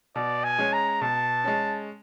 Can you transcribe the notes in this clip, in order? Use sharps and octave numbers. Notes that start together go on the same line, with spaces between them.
B2 D5
G#5
G#3 C#4
A#5
B2 A5
G#3 C#4